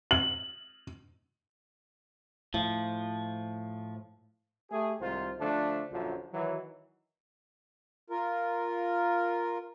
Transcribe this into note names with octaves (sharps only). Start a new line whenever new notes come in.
F#7
A2 F3
A3 G4 G#4
C2 G#2 D#3 F4 C5
D3 F3 A3 D4
A#1 F#2 D3 F3
D#3 E3 F#3
F4 A#4